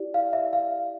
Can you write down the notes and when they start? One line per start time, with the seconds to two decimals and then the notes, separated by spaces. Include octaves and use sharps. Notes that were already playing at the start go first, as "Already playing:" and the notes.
Already playing: E4 G4 D5
0.14 F5
0.33 E5
0.53 F5